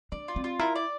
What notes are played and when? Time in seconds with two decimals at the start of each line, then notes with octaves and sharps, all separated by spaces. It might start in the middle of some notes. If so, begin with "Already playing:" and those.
0.12 D4 D5
0.28 F4
0.36 C4
0.44 F4
0.59 E4 A#4
0.76 D5